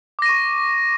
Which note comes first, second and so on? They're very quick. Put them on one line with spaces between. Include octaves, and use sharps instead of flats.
D6 A#6 D#7 C#6